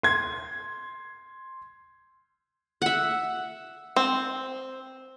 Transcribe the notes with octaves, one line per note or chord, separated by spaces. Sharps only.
C6 G#6
E5 F#5
C4